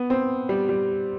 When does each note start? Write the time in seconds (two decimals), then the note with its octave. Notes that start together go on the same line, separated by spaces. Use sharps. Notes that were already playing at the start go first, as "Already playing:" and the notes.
Already playing: B3
0.10 C4
0.49 G3
0.69 G3